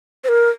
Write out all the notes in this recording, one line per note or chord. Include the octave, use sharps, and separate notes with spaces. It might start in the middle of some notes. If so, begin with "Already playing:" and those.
C5
A#4